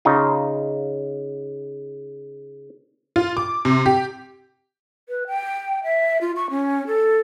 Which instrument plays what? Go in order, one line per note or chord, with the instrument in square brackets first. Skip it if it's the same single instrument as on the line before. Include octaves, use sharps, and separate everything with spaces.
[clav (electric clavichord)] C#3 D#4 F4
[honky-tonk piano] F4
D6
C3
G4
[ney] B4
G5
E5
F4
C#6
C#4
A4